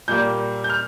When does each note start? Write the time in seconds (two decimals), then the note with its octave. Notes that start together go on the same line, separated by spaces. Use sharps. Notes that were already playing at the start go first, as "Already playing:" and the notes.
0.08 A#2 G3 A#3 G6
0.64 G6
0.70 F6